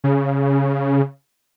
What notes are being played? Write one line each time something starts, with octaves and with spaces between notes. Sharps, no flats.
C#3